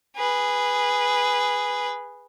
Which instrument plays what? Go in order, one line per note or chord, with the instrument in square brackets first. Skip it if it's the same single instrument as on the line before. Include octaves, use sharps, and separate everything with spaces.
[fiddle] G#4 B4